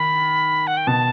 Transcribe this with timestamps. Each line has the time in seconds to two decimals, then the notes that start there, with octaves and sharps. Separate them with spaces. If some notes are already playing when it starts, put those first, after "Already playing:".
Already playing: D#3 B5
0.67 F#5
0.77 G5
0.87 B2 A5